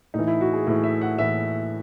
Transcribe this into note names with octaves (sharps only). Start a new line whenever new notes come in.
A2 E3 D#4
E4
F#4
G#4
A2 E3
E5
F#5
A2 E3 E5